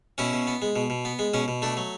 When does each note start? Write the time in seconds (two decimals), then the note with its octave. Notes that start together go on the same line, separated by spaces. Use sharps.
0.18 B2 C#4 E4
0.33 B2
0.47 B3
0.62 G#3
0.76 B2
0.90 B2
1.05 B3
1.19 G#3
1.34 B2 C#4
1.48 B2
1.62 A3 D4
1.77 F#3